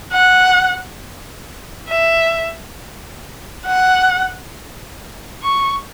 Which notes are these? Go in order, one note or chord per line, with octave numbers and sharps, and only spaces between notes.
F#5
E5
F#5
C#6